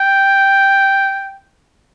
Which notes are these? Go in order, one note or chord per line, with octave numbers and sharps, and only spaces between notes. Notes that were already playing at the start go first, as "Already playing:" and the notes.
Already playing: G5